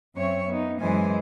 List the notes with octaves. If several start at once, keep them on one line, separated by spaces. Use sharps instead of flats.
F#2 C4 C#5 E5 C#6
B3 D#4
F#2 E3 G#3 C5 G#5